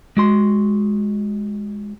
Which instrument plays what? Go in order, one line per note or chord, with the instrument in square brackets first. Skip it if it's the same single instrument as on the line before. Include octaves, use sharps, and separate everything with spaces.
[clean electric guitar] G#3 F#4 C6